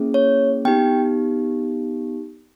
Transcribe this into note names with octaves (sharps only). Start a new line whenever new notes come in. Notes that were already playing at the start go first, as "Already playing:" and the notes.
Already playing: A#3 C#4 E4 G#4
C#5
B3 D#4 G4 G5